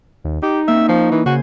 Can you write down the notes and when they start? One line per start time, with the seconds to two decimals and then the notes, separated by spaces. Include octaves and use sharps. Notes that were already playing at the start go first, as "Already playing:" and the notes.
0.24 D#2
0.42 D#4 G4
0.68 A#3 C4 C#4 E5
0.88 F3 C#6
1.11 E3
1.26 C#3 F#4 C5 G#5